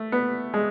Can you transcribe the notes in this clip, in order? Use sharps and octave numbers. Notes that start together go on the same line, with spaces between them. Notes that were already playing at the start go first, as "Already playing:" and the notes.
Already playing: A3
B3
G#3